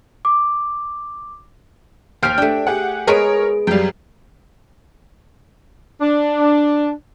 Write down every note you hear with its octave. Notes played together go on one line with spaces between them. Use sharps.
D6
D#2 G4 C5 F6 D7
A3 D4 G5
G4 G#4 F#5
G#3 B3 G#4 A#4 C#5 D7
F#2 G3 F5 G5
D4